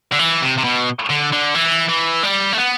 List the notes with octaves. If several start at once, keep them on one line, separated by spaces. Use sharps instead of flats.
D3
E3
C3
C3
B2
D3
D3
E3
E3
G3
A3
B3